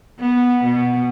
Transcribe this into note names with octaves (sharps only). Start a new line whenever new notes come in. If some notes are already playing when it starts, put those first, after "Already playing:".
B3
B2